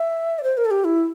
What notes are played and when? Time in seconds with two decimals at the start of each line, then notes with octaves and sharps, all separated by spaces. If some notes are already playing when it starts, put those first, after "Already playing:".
Already playing: E5
0.39 D5
0.43 C5
0.57 A#4
0.65 A4
0.71 G4
0.84 E4